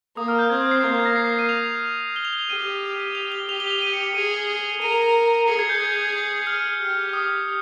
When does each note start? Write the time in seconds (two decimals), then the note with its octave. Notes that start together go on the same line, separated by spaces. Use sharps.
0.16 A#3 D#6
0.28 F6
0.39 G6
0.50 C4 G#6
0.61 G#6
0.71 C7
0.82 A#3 C7
0.94 G#6
1.06 A#6
1.16 C7
1.27 C7
1.39 D#7
1.49 F7
2.16 G7
2.25 F7
2.33 G7
2.49 G4 D#7
3.15 F7
3.32 G7
3.49 G4 F7
3.60 G7
3.71 F7
3.82 D#7
3.93 C#7
4.03 F7
4.15 G#4 D#7
4.31 F7
4.81 A#4 D#7
4.92 F7
5.48 G#4 C#7
5.59 G#6
5.69 G6
5.80 G#6
5.89 G6
6.47 F6
6.81 G4
7.13 D#6